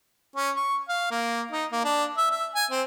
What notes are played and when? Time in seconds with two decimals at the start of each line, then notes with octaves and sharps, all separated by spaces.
0.36 C#4
0.56 C#6
0.89 F5
1.11 A#3
1.52 D#4
1.72 A#3
1.84 D4
2.17 E5
2.31 E5
2.55 G#5
2.71 C4